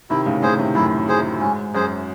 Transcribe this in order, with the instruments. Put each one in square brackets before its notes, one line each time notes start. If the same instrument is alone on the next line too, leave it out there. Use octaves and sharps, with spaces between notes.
[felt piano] C3 D#3 [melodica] E4
[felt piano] A2 C#3
[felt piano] A2 C#3 [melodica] G#4 C5
[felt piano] C3 D#3
[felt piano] F#2 A2 [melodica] E4
[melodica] G#4 C5
[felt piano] G#2 [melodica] C#4
[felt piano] F#2 [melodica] G#4 C5